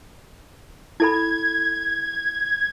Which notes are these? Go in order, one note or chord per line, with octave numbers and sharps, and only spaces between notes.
E4 A4 B5 G#6